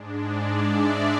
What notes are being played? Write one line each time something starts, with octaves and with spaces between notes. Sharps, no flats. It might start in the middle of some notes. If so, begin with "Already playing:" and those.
Already playing: G#2 G#3 D4
D5
E5